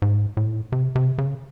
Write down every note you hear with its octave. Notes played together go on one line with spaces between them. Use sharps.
G#2
A2
C3
C3
C#3